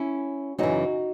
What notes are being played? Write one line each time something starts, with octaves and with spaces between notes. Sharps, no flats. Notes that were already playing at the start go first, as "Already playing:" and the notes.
Already playing: C#4 E4
F#2 C#3 E3 D#4 F#4